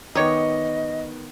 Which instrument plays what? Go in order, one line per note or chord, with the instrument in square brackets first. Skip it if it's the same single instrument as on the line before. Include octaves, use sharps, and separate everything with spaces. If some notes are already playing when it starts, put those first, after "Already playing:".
[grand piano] D#3 B3 [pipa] D#4 G4 C#5 [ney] D#5